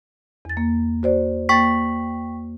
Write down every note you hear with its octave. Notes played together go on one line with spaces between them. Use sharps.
E2 A6
A#3
F#4 C5 D5
A#3 G5 C#6 A6 B6